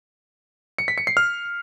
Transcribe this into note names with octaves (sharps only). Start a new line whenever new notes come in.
C#7
B6
C#7
C7
F6